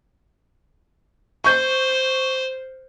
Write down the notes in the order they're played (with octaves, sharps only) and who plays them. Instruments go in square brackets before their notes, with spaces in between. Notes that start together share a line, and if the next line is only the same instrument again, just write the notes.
[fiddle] C5 [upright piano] C#6 G6